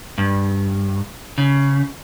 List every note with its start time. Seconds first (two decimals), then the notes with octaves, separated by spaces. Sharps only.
0.18 G2
1.38 C#3